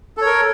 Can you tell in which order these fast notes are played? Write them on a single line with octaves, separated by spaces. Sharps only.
A4 C#5 A#4